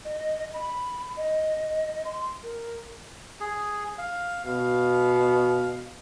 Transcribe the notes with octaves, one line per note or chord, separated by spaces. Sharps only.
D#5
B5
D#5
C6
A#4
G#4
F5
B2 F5